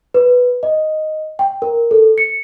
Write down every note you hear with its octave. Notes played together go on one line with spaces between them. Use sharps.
B4
D#5
G5
A#4
A4
C#7